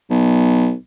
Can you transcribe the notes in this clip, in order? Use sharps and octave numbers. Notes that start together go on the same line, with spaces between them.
B1